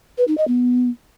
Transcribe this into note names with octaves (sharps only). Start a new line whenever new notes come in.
B4
D#4
D#5
B3